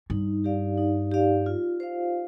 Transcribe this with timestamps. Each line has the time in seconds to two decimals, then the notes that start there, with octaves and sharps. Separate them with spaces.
0.10 G2 D#4
0.44 G4 D5 F5
0.78 D#4
1.12 G4 D5 F5
1.46 F4
1.80 C5 F5